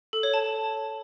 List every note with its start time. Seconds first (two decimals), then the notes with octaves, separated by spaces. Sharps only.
0.13 A4
0.23 C#5
0.34 A5